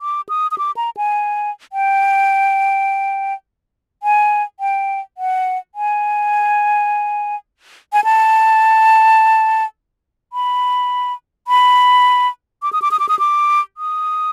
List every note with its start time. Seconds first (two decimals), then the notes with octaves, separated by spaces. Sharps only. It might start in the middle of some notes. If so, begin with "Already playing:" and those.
0.01 D6
0.29 D#6
0.51 D#6
0.58 D6
0.77 A#5
0.97 G#5
1.73 G5
4.03 G#5
4.60 G5
5.18 F#5
5.75 G#5
7.93 G#5
8.04 A5
10.33 B5
11.48 B5
12.63 D6
12.73 D#6
12.82 D6
12.91 D#6
12.99 D6
13.09 D#6
13.19 D6
13.77 D#6